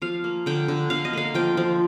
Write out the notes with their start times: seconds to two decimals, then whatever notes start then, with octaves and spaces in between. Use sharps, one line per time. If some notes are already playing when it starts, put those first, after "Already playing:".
0.02 F3 F5
0.24 A#3
0.46 D3 G5
0.68 D3
0.90 D3 F5
1.05 D#5
1.13 A#3 F5
1.34 F3 G5
1.57 F3